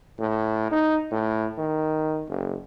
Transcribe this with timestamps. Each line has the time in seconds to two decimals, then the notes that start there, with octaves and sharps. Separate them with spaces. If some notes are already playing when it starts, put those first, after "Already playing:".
0.19 A2
0.71 D#4
1.11 A2
1.58 D#3
2.28 F#1